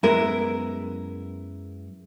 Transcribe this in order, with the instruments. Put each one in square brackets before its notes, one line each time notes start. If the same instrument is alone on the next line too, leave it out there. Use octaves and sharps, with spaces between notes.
[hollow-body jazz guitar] F#2 G#3 B3 [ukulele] E4 A#4